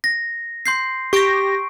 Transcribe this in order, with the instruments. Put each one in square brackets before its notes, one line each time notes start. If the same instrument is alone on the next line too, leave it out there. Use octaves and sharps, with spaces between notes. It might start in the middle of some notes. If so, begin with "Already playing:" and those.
[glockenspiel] A#6
C6 G6 C7
[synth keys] G4 A#6 [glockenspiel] C#6 D7